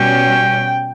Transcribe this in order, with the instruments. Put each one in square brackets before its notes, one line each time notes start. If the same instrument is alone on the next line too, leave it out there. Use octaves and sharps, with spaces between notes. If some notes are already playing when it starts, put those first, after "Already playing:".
Already playing: [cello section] B2 G3 C#4 [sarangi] G5